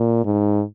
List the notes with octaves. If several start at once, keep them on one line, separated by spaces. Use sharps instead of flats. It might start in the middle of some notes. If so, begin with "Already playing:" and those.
Already playing: A#2
G#2